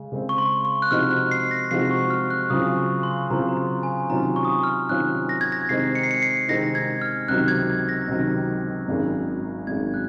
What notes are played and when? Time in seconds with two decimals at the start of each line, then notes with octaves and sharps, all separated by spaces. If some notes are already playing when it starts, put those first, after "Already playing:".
Already playing: C#3 G#3
0.12 C#3 G#3 C4
0.29 C#6
0.38 C6
0.65 C#6
0.82 F#6
0.91 C3 F3 G#3 D#4 F#4 F6
1.11 F#6
1.31 C7
1.51 A#6
1.71 C3 F3 G#3 D#4 F#4 C7
1.91 C#6
2.10 F6
2.30 F#6
2.43 C#6
2.50 C#3 F#3 C4 F4 D#6
2.77 C#6
3.03 C6
3.30 C#3 F#3 C4 F4 A#5
3.49 A#5
3.57 C6
3.83 G#5
4.10 C3 D#3 F#3 C#4 F4 A#5
4.36 C#6
4.45 D#6
4.53 C#6
4.63 F6
4.89 C3 D#3 F#3 C#4 F4 F#6
5.29 A#6
5.41 G#6
5.52 A#6
5.69 C3 D#3 G#3 C4 D#4 C7
5.95 C#7
6.03 C7
6.11 C#7
6.22 C7
6.48 C3 D#3 G#3 C4 D#4 A#6
6.75 G#6
7.01 F6
7.28 C#2 C3 D#3 F#3 F#6
7.48 G#6
7.89 A#6
8.08 C#2 C3 D#3 F#3
8.88 G#1 F#2 D#3 G#3
9.67 G#1 F#2 D#3 G#3 G#6
9.94 F#6